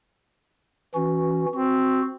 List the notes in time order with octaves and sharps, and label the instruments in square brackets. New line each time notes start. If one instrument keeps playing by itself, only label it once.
[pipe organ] E3 C#4 F#4
[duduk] C4 [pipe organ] F#4